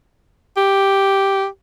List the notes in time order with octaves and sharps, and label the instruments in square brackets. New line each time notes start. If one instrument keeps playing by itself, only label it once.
[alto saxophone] G4